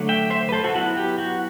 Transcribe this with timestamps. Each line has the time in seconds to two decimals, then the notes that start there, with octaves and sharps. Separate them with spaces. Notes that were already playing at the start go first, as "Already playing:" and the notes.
Already playing: D3 F#3 A3
0.09 E5 G5
0.30 C5 E5
0.49 B4
0.52 A4 C5
0.64 F#4 A4
0.75 F#3 B3 E4 F#4
0.97 G4
1.18 F#4